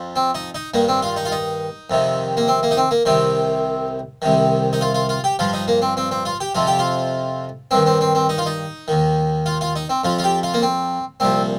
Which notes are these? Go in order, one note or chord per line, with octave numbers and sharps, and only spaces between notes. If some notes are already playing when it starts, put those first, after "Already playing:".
Already playing: F2 F3
C4
D#4
D#4
G2 D#3 A#3
C4
F4
D#4
F4
D#4
F2 C3 D#3
A#3
C4
A#3
D#4
C4
A#3
C2 C3 D#3 C4
C2 C3 D#3
D#4
F4
F4
F4
G4
G2 F3 F4
D#4
A#3
C4
C4
C4
F4
G4
F2 C3 F3 F4
G4
F4
G2 D#3 C4
C4
C4
C4
D#4
F4
D#4
D#2 D#3
F4
F4
D#4
C4
F2 F3 F4
F4
G4
F4
A#3
C4
C2 A#2 F3 C4